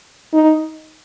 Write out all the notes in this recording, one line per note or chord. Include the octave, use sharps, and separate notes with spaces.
D#4